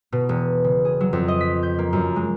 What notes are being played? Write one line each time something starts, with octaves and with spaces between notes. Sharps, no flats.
B2
E1
C#3
G#4
F#3
F2
D#5
B6
G6
A#3
F#2
G#3